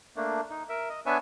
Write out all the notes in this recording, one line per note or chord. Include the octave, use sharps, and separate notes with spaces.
A3 A#3 D4
D#4
A#4 E5
D#5
B3 D4 B4 C#5 E5 G#5